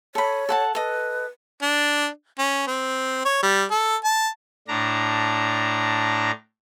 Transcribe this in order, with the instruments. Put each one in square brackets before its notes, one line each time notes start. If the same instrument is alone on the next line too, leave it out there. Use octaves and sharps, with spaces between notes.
[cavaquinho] A4 B5 [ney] C#5
[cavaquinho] A4 F#5 A5
[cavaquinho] A4 D#5 [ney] B4
[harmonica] D4
C#4
C4
C#5
G3
A4
A5
[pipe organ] A2 D4 A#5